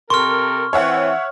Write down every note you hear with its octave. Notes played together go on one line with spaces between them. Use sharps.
C3 A4 A#4 C6 C#6 F6
E3 C4 C#5 E5 F#5